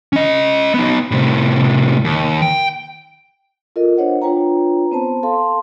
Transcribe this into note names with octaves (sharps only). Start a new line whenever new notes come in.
C#4 D#5
B3 D#4
A2 C3
D#2
G5
F4 A4 A#4 D#5
D4 C5 C#5 D#5 F#5
D4 F4 B4 C#5 G5 A#5
B3 C4 C5 A5
A4 F5 A5 C6